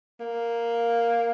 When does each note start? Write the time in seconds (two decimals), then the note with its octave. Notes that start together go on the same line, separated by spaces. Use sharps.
0.20 A#3